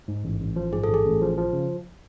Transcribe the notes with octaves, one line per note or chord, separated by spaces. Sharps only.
G#2
A1
A1
F3
G#2 G#4
A1 A4
G#4
A1
F3
F3
C#3